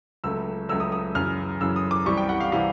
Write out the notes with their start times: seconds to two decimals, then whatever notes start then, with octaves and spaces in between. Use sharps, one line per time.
0.24 C#2 C#3 F#3 A3 E6
0.69 C#2 C#3 F#3 A3 E6
0.80 D#6
0.92 D#6
1.15 F#2 C#3 E3 F6
1.61 F#2 C#3 E3 E6
1.76 D#6
1.91 D6
2.05 C2 C3 E3 G3 C#6
2.17 G5
2.29 F#5
2.40 F5
2.52 C3 E3 G3 F5